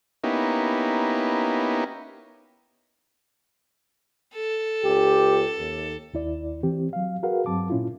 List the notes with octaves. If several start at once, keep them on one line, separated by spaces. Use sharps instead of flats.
A#3 B3 C#4 D#4 E4 G4
A4
C#2 G4
D#2
D#2 E4 D5
E3 C4 G4
F#3 F5
F#4 G#4 A#4 B4 F5 F#5
G2 F#3 C4 A5 D6
A#2 C#4 E4 F4